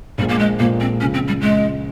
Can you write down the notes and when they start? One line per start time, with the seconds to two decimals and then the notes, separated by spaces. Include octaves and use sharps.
0.18 A#1 A#2 F3 G3 G#3
0.29 A#3
0.39 G#3
0.59 A#1 A#2 F3 G#3 A#3
0.80 C4
1.00 C#2 C#3 F3 C#4
1.14 C4
1.28 G3
1.41 C#2 C#3 F3 G#3